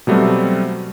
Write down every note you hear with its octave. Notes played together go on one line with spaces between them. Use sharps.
B2 F#3 G3 A3 C4